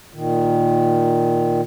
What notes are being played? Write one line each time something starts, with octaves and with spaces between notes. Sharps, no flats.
A#2 D#3